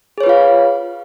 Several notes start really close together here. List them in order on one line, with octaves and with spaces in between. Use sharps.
G#4 C#5 B4 F4 F5